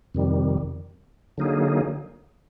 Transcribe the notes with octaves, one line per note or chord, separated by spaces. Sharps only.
F2 C3 D#3 G3
D3 F#3 A#3 D#4 G#4